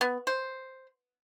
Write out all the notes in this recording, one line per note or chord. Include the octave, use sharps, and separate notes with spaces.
B3
C5